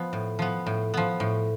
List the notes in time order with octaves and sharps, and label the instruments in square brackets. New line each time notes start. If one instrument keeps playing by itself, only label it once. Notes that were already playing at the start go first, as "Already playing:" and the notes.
Already playing: [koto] F3 B3
A2
F3 B3
A2
F3 B3
A2